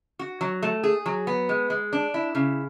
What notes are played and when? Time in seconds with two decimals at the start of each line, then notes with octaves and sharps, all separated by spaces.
0.19 F#4
0.41 F#3
0.62 A3
0.84 G#4
1.06 F#3
1.27 B3
1.49 G#3
1.70 G#3
1.93 D4
2.14 E4
2.35 C#3